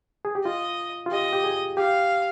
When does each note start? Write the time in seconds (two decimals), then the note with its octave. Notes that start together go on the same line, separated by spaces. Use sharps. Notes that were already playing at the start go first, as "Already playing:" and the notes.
0.25 G#4
0.35 G4
0.45 F4 D#5
1.06 F4
1.12 G4 D#5
1.33 G4
1.44 G#4
1.77 G4 F5